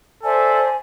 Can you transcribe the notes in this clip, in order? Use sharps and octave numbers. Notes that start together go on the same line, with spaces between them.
A4 C5 D5 E5 G#5